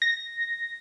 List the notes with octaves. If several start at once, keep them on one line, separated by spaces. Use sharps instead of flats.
A#6